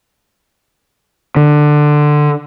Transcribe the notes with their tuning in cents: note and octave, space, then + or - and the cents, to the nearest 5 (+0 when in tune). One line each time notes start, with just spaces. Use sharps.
D3 +15